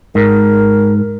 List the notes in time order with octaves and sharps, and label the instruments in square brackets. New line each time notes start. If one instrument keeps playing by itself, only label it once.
[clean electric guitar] G#2 [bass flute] A#4